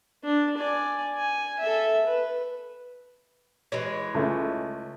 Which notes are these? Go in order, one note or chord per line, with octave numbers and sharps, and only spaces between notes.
D4
D5 G#5
G#5
A4 E5
B4
E3 G#3 C#5
C#2 A3